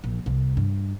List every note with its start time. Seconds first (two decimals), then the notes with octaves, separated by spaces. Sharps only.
0.04 A#1
0.26 C2
0.57 G2